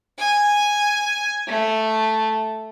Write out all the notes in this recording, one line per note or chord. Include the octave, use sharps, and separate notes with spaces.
G#5
A3